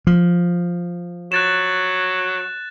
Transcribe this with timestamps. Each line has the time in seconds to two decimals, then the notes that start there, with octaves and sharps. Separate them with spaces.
0.07 F3
1.32 F#3 F#6 A6 E7